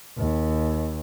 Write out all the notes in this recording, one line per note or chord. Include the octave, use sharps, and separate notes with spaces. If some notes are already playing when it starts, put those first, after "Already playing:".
D#2